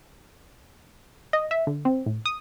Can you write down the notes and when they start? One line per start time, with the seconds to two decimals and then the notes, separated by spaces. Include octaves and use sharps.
1.33 D#5
1.51 E5
1.67 D3
1.85 C4
2.06 A2
2.26 D#6